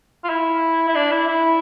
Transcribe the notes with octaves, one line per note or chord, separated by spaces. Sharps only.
F4
E4
E4
D4
E4
E4